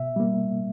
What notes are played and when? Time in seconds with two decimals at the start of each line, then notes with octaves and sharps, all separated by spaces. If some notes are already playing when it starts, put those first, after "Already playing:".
Already playing: B2 E5
0.16 G3 A#3